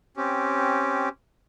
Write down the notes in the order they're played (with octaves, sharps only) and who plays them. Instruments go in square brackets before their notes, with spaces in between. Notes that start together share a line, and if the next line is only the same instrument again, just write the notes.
[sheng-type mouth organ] C4 C#4 G4